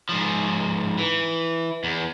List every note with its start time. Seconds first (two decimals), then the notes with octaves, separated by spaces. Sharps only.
0.09 G#2 F3
0.98 E3
1.84 E2